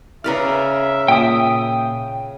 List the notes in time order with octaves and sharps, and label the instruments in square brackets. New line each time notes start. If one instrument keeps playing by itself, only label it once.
[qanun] C#3 B4 D5 [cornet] E5 [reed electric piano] A#5 F6
[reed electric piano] A#2 [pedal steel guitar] G5 D#6